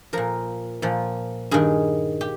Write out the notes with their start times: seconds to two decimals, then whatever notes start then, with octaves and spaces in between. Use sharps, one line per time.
0.13 A#2 F3 A#4
0.82 A#2 F3
1.51 G2 D#3 G#4
2.21 G4